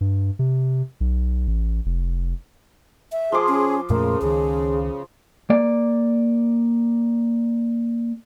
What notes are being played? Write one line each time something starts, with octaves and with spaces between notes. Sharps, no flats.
G2
C3
B1
A1
F1
E5
F3 G#4 C5 D6
C#4
F2 A#2 C#3 A3 A#4
C#2 D#3 G#4
A#3 D5